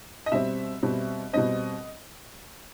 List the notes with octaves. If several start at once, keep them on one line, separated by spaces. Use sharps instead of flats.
D#5
B2 G3 C4 E5
B2 G3 C4
B2 G3 C4 D#5